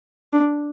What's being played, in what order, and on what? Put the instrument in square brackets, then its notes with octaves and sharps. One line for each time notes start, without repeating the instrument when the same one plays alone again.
[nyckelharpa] D4